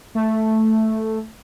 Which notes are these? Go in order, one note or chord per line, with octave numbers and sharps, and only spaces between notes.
A3